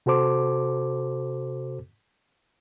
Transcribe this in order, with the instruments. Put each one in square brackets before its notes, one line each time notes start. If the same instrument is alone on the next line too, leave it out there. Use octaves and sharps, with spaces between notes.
[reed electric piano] C3 F#4 A4 C5 D6